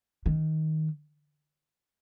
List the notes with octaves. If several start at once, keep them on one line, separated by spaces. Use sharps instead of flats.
D#3